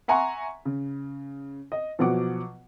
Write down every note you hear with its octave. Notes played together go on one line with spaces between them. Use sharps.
E5 F#5 G#5 A#5 C6 C#6
C#3
D#5
B2 F3 F#3 F#5 D6